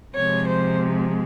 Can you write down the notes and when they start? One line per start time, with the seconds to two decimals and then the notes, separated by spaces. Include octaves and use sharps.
0.15 C3 F3 G#3 C#5
0.47 C5